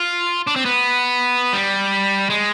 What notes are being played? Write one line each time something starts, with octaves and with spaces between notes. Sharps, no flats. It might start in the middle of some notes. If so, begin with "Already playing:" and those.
Already playing: F4
D4
C4
B3
G3
G#3